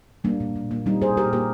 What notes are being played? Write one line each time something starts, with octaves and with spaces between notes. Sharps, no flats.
G3 A#3 D4
A#2
A#2
A#3
G3 C4 D#4
A#2 G#4 C5
A#2 G4 A#4
A#3 G4 A#4